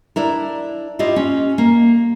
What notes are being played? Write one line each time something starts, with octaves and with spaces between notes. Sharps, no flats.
D4 E4 A#4
E4 F4 G4 D#5
C#4
A#3